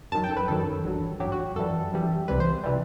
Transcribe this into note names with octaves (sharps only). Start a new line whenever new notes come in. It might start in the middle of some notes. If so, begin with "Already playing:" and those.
F#2 D#3 F#3 A5
G5
A4
B4
F#2 D#3 F#3 A4
A1 G2 F#3
A1 G2 F#3 G4
F#4
F#2 E3 G3 A4
F#2 E3 G3
C2 C3 E3 G3 B4
C5
C3 E3 G3